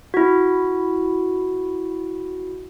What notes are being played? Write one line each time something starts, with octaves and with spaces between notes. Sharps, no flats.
E4 F#4